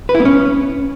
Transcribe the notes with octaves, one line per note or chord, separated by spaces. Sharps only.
B4
E4
B3
C#4